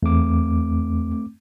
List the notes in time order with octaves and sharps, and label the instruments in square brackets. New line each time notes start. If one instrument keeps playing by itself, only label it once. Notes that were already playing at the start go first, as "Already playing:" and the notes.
[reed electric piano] E2 [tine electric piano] A3 C4 D6